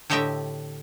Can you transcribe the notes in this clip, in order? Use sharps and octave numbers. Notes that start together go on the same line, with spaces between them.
A2 D3 G4 D#5 E5 G5